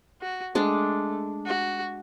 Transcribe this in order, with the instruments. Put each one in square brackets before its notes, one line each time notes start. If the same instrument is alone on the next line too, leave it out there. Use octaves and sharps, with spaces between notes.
[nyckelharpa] F#4
[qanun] G#3 D4 [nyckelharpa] A3
[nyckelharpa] F#4